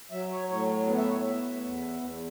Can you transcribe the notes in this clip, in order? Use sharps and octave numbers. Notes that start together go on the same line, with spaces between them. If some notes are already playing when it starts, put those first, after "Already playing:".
F#3 E5
C#5
A2 C#5
B3
E5
C#5
B3 E5
E2
E2